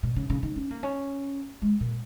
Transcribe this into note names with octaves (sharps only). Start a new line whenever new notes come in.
A#2
C#3
C#3
D#3
C#4
A#3
C#4
G#3
A#2